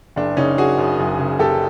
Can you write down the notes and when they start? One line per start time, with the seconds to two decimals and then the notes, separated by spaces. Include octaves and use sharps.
0.16 F#1 D4
0.37 C#3 C#4 D#4
0.58 F#1 F#4 G#4
0.78 F#2
0.99 F#1
1.19 C#3
1.39 F#1 G4 A4